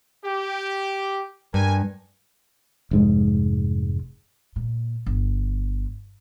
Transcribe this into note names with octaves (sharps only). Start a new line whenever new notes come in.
G4
G2 A#4 G#5
F1 G#2 G#3
A#2
G1